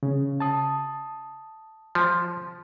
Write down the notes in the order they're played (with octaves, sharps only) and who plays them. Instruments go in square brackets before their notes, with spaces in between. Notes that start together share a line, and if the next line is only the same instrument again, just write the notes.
[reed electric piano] C#3
A5 D#6
[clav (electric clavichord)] F3